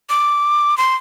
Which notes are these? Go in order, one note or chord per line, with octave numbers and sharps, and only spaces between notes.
D6
C6